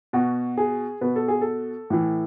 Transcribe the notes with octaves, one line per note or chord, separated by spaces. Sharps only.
B2 F#4
G#4
B2 B4
A4
G#4
A4
A2 E3